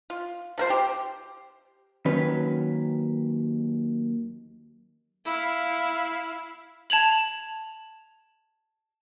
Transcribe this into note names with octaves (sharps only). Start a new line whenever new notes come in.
F4
F3 A#4 C5
G4
D#2 D#3 F#3 C#4 B4
E4 F5
A5 G#6 F7 F#7